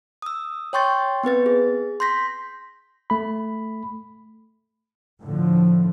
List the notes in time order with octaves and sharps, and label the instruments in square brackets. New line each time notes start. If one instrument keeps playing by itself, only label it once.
[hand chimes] D#6 E6
C#5 G5 C6 C#6 G6 A6
B3 C4 B4 A6
G#4
C6 G6 A#6 B6
[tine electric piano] A3 B5
[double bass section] A2 D3 F3